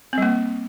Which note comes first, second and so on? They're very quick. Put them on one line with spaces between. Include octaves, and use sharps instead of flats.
C4 G3 A#3